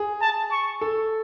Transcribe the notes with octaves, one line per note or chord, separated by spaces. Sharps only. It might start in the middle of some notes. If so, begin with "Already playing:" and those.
Already playing: G#4
A5
C#6
A4